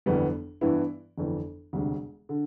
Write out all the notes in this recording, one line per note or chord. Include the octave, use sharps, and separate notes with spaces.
G1 F2 E3 G3 B3
G2 E3 B3 E4
G1 F2 E3
E1 D2 C3 G3
D3